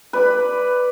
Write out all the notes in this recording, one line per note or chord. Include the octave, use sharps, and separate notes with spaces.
B4 D5 B5